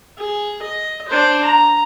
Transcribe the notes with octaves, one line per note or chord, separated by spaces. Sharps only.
G#4
D#5
D4 C5
A#5